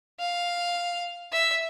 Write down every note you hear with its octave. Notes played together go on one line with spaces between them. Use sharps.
F5
E5